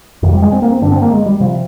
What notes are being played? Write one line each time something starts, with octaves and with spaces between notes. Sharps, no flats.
F2 C3 D#3
G3
G#3
C4
A#3
C4
G2 D3 D4
C4
A#3
G#3
G3
C3 F3